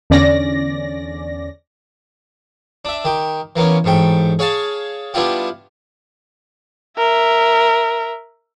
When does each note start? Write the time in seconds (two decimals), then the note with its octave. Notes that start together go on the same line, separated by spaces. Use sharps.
0.10 E2 D3 C#4 D5 A#6
2.85 D4 E5
3.05 D#3 G4
3.56 E3 A#3 B3 C#4
3.84 A1 G#2 A3 G5
4.39 G#4 C#5 F5 G#5 A5
5.14 G3 B3 D4 E4 F4 G4
6.97 A#4 E5